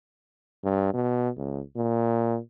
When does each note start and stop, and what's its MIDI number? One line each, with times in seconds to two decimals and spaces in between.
0.64 0.90 43
0.93 1.29 47
1.37 1.61 37
1.76 2.38 46